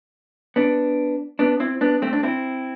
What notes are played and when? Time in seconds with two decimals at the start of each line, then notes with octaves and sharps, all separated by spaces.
0.56 B3 D4
1.39 B3 D4
1.60 C4 E4
1.81 B3 D4
2.02 A3 C4
2.13 D4
2.23 C4 E4